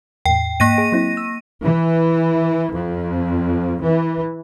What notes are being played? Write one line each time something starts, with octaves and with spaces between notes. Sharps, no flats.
E2 A2 G5
G#2 A#3 A#6 D#7
G#4
F#3 C4 E4
E6
E3
F2
E3